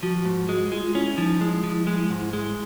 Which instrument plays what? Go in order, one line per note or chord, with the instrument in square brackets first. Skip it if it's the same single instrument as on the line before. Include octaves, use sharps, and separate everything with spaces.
[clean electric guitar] F3 [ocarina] F#4
[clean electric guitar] G#2
G#3
[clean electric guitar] G#3 [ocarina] F4
[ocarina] F4
[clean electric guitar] C#4 [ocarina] E4
[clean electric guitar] F3 [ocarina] D#4
[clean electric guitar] G#3 [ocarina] E4
[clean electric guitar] F3
G#3
G#2
G#3